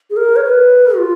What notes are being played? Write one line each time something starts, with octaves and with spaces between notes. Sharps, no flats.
G#4
A#4
C#5
B4
F4